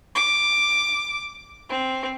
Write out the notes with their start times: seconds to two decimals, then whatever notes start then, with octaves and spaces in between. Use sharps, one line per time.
0.15 D6
1.70 C4